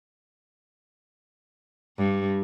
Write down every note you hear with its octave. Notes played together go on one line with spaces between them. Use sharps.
G2